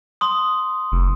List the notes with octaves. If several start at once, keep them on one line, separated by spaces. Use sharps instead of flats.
C6 D#6
F1